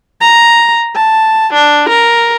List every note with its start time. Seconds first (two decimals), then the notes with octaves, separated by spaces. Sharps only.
0.21 A#5
0.96 A5
1.53 D4
1.89 A#4